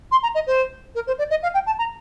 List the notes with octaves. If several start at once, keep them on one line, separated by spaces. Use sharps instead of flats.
C6
A#5
D#5
C5
A#4
C5
D5
D#5
F5
G5
A5
A#5